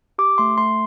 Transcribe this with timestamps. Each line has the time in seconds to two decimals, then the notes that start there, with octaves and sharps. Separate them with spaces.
0.18 G4 D6
0.38 A3 C6
0.58 A3 C6